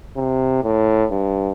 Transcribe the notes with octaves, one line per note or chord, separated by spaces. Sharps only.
C3
A2
G2